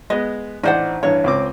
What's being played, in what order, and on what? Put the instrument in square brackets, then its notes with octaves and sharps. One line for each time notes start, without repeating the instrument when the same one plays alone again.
[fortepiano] G#3 B3 [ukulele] D#5
[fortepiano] A1 D4 D5 [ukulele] D#4 C5 F#5
[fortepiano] A1 G2 [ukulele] C#5
[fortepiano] C#2 C4 D6